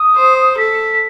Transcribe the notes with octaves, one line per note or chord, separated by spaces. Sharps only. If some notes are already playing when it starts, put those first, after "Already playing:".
Already playing: D#6
C5
A4 B6